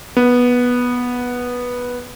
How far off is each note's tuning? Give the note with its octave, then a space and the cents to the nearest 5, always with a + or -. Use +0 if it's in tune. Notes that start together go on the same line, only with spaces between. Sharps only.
B3 -10